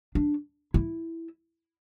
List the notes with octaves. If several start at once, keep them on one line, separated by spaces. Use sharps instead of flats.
D4
E4